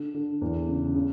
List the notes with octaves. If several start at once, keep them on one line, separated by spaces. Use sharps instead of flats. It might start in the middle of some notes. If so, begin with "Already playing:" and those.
Already playing: D3
D3
E2
C#3
C#3